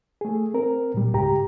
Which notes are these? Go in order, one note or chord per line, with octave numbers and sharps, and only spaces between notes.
A3 G#4
C4 A#4
A#2 G3
C#2 G#2 G4 A#5